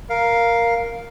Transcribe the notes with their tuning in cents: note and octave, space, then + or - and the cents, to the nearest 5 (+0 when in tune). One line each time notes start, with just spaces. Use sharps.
A#4 +0 F5 +0